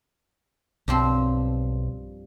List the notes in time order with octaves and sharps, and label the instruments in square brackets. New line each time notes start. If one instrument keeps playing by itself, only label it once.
[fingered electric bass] B1 [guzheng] G2 F3 C4